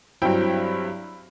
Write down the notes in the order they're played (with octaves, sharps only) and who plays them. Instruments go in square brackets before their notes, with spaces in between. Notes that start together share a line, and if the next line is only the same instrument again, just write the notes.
[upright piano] G2 F#3 C4 E4 G5